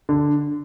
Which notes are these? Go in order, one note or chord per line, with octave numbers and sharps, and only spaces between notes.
D3